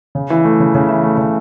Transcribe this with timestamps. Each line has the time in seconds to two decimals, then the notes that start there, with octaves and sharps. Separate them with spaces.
0.15 C#3
0.30 E3
0.45 A3
0.60 C#3
0.75 C#3
0.89 E3
1.03 A3
1.18 C#3